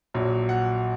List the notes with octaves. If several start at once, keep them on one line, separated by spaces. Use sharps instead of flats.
A#1 A#2 F#3
F#5